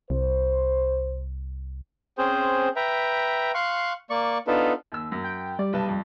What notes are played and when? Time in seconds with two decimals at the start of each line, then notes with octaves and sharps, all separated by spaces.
0.10 C2 C5
2.18 C4 C#4 G#4 C5
2.76 B4 E5 G5 A#5
3.54 F5 C6 C#6 F#6
4.10 A#3 D5 C#6
4.47 B3 D4 D#4 F4 A4 B4
4.92 D#2 E6
5.12 F#2
5.24 G5
5.59 G3 D5
5.73 B1 B4 A5
5.88 F2